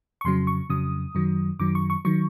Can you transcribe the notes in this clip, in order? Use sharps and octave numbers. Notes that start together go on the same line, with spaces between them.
C#6
F2 C#3 F#3 C6
C#6
F2 C#3 F#3 D#6
F#2 D#3 F#3
F#2 D#3 F#3 D6
C#6
C#6
D#3 F#3 C#6